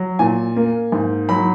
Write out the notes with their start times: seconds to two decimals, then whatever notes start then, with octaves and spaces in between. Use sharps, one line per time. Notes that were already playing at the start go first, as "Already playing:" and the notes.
Already playing: F#3
0.19 A#2 G#5
0.56 A#3
0.92 G#2
1.29 F#3 B5